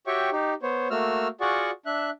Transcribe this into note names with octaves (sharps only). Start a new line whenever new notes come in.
F#4 G4 C#5 E5 G5 C#6
D#4 G4
B3 C5 C#5
A3 A#3 F#4 E6 F6
F4 F#4 G#4 D5 F#5 C#6
D4 E5 F#6